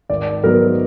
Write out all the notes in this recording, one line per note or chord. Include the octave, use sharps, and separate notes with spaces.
G#1 D5
G#2 F#3 B3 D#4 A#4